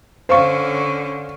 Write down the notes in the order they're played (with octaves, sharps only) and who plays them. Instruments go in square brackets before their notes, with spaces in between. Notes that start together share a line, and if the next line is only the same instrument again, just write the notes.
[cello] D3 C#4 [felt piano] C5 F5 C#6